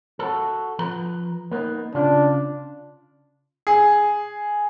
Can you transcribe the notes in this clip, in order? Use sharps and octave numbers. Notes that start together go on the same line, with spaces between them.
F#4 A4
F3 B4 A#5
A#3 B3 D#4
C#3 D4 F4
G#4